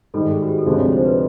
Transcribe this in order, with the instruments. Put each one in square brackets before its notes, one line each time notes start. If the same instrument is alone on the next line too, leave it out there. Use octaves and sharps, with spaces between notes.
[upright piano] G#2 D#3 G3 [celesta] A4
[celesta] G#4
F#4
G4
A4
[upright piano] D2 C3 F3 G#3 [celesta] G#4
[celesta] C#5
D5
C5
B4